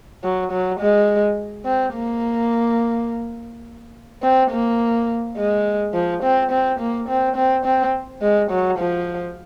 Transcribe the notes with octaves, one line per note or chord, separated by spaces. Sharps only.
F#3
F#3
G#3
C4
A#3
C4
A#3
G#3
F3
C4
C4
A#3
C4
C4
C4
G#3
F#3
F3